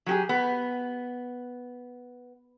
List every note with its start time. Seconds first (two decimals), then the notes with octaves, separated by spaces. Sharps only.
0.06 F#3 G4 G#4
0.29 B3